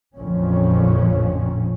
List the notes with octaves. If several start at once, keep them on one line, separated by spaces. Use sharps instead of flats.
A1 F2 A#2 D3 F3 C#4